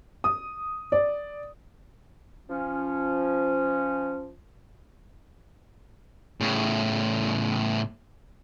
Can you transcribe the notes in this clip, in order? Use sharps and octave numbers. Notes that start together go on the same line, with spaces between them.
D#6
D5
F3 C#4
A2 C#3